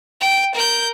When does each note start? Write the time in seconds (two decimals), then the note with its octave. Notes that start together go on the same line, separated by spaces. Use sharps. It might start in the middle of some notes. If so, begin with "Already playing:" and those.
0.21 G5
0.55 A#4 G6